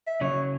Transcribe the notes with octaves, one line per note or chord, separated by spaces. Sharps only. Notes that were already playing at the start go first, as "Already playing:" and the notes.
E5
C#3 F#3 C#5